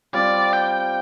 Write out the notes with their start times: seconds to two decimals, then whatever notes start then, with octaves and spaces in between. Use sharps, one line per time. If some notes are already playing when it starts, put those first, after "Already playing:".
0.13 G3 C4 F4 D5
0.53 G5